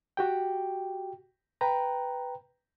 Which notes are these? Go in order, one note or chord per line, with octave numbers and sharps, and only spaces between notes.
F#4 G4 G5
B4 G5 A#5